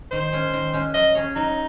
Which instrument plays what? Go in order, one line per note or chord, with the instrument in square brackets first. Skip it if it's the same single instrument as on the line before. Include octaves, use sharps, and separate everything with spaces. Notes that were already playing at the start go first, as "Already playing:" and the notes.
[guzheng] D#3 [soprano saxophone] C5
[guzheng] G#3 C#4
D#3
G#3 C#4
[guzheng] F#3 [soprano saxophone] D#5
[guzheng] C#4 G#4 C#5
[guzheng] F#3 [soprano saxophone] D#4